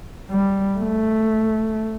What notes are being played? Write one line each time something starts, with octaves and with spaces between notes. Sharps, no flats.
G3
A3